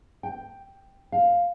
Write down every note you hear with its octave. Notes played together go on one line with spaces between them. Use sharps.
G5
F5